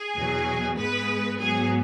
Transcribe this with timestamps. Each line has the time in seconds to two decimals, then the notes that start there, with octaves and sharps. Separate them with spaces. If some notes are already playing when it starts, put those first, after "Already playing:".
Already playing: G#4
0.15 E2 B2 F#3
0.76 G#2 G#3 B3 B4
1.38 G#2 F#3 B3 G#4